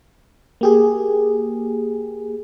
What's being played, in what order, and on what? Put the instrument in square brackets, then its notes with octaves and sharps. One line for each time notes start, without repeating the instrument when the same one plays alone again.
[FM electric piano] A#3 G4 G#4